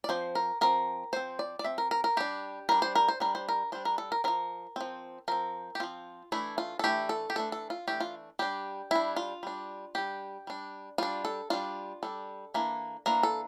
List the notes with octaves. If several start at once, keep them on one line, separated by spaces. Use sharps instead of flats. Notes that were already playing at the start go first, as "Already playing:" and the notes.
D5
F3 C4 C5
A#4
F3 C4 A#4
F3 C4 C5
D5
D5
F3 C4 E5
A#4
A#4
A#4
G3 D4 G4
G3 D4 A#4
C5
A#4
C5
G3 D4 A#4
C5
A#4
G3 D4 C5
A#4
A4
A#4
F3 C4 A#4
F3 C4
F3 C4 A#4
G4
F3 C4 F4
E3 A3 D4 E4
F4
A4
E3 A3 D4 G4
A4
G4
E3 A3 D4 A4
A4
F4
E3 A3 D4 G4
F4
G3 D4 G4
G3 D4 E4
F4
G3 D4
G3 D4 G4
G3 D4
G3 D4 F4
A4
G3 D4 F4
G3 D4 A4
E3 A#3 D4
E3 A#3 D4 A#4
A4